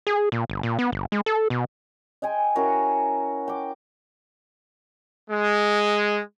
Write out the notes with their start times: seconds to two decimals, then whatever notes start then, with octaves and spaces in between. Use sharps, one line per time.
0.07 G#4
0.32 A#2
0.50 G1
0.63 A#2
0.79 B3
0.92 G1
1.12 G#3
1.26 A4
1.50 B2
2.22 D#5 G5 G#5 C6
2.56 C#4 E4 F#4 A#4
3.48 G5 D6
5.30 G#3